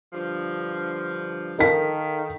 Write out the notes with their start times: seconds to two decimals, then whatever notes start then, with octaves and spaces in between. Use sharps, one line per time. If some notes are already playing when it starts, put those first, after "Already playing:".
0.13 G2 D3 F3
1.59 D#3 D#4 A4 A#4 F5 B6